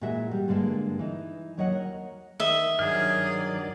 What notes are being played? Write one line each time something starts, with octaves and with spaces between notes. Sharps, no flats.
A#2 E3 G#3 F#4 E5
G3
G2 D3 G#3 A#3 D4
E3 D#4
D#2 F#3 C#5 D#5 E5 F#5
A#4
D#3 D#5 E5
G2 D#3 F#3 G#4 D5 F6